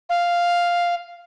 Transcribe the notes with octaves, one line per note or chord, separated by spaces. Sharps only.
F5